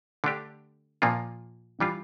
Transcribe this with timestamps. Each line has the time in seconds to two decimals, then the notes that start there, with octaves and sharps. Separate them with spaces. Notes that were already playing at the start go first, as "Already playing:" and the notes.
0.24 D3 A3 D4 G4
1.02 A#2 F3 A#3 F4
1.80 E3 G3 D4 F4